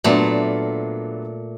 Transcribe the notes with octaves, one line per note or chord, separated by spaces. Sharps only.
A#2 F#3 A3 B3 D4